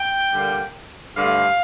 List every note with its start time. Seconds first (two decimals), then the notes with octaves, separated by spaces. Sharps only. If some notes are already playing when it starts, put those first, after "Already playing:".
Already playing: G5
0.32 D3 G3 A#3
1.16 G2 D3 A3 F5